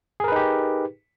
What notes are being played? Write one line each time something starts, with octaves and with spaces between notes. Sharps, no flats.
D#4 G4 G#4 A#4 B4